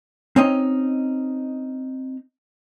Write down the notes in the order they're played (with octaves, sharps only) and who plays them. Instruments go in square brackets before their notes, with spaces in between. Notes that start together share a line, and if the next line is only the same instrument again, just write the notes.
[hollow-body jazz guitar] C4 C#4 D#4 D#5